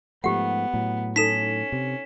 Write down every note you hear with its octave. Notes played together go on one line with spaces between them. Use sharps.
G#2 F3 A3 B3 G4 F#5
A2 F#3
C#4 D#4 A4 B6 E7
C3